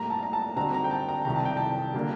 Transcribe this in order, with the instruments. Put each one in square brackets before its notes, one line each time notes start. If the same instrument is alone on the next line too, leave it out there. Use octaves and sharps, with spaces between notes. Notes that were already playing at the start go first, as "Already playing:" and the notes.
Already playing: [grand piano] A2 G3 A#3 [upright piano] A#5
[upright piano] A5
A#5
A5
[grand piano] D3 G3 C4 D#4 F#4 [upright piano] A#5
[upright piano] A#5
G5
A5
A#5
[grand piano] C2 C3 D#3 [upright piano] A#5
[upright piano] A5
G5
A5
[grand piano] D3 G3 A#3